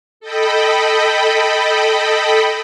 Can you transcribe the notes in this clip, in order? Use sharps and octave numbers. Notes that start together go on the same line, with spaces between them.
A4 D#5 G5 B5